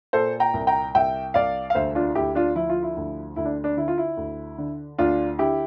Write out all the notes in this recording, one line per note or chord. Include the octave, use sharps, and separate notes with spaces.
A#2 A4 C5
G5 A#5
C2
G5 A#5
C2 E5 G5
C2 D5 F5
F5
D2 C5 E5
D4 F4
D2 E4 G4
D4 F4
F3 E4
F4
E4
D2
D2 E4
D4
D4
D3 E4
F4
E4
D2
D3
D2 D4 F4
D3 E4 G4